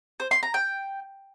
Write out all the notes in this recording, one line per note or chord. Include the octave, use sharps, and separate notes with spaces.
C5
C6
A#5
G5